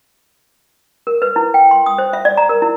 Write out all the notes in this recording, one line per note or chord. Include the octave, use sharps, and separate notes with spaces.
A#4
B4
E4
G5
C6
D#6
C5
E5
D5
A#5
A#4
E4